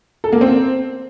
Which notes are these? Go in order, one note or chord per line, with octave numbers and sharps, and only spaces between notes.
A4
A#3
C4